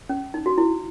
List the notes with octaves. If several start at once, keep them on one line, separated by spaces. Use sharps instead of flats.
C#4
D#4
F#4
E4